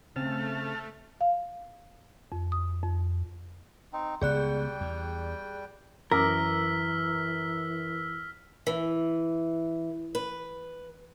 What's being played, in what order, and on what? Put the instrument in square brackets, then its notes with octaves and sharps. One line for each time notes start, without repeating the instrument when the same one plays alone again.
[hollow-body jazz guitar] C#3 C4 [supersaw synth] A3 [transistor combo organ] A5 F6
[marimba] F5
F2
D#6
F2
[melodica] C4 D#4
[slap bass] C#2 C#3 B3 [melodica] G3 G5 [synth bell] G#4 D5 F#6
[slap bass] E2
[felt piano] F#2 A#5 D6 [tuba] E3 [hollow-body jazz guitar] A#4 [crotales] E6 F6 B6
[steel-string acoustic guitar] E3
B4